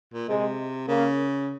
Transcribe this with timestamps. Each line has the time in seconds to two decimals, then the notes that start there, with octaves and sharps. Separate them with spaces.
0.14 A#2
0.29 C3 G#3
0.88 C#3 A#3